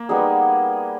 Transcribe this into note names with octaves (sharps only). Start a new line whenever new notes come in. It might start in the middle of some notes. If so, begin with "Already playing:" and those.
Already playing: A#3
G3 B3 D#4 G#4